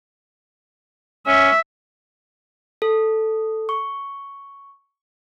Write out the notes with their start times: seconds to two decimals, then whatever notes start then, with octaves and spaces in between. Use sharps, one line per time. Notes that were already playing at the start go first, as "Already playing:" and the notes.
1.27 C#4 E5
2.82 A4
3.69 C#6